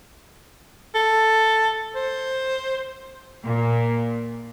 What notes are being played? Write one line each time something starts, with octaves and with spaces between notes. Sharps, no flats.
A4
C5
A#2